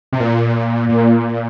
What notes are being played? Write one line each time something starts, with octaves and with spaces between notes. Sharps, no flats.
C3
A#2
A#2